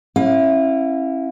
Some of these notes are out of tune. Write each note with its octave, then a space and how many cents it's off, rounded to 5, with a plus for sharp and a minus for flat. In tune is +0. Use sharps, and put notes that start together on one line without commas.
C#4 -35 E4 +0 F5 +30